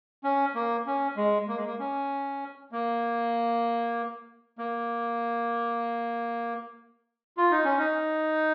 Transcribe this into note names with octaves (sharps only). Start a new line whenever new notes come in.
C#4
A#3
C#4
G#3
A#3
G#3
A#3
C#4
A#3
A#3
F4
D#4
C#4
D#4